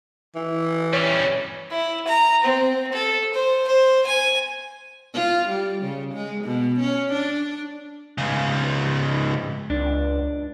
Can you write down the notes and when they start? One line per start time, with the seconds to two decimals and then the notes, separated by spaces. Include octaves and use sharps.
0.35 E3
0.93 G3 C#4 C#5
1.71 E4
2.07 A#5
2.43 C4
2.92 A4
3.33 C5
3.67 C5
4.06 G#5
5.13 F4
5.49 G3
5.83 C#3
6.14 G#3
6.44 B2
6.80 C#4
7.12 D4
8.18 G#2 C#3
9.70 C#2 D4